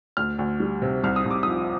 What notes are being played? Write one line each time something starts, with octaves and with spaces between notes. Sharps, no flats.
D2 F6
D2
G3
C3
C2 F6
D#6
C2 D6
F3 D#6